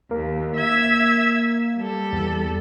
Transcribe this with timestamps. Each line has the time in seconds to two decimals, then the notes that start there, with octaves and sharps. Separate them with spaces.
0.11 D#2 A#3
0.55 E5 E6 G#6
1.77 G3 A4
2.13 E2